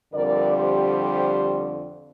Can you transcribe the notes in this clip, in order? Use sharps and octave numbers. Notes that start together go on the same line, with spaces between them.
F2 D3 G3 A#4 D5
G4 C5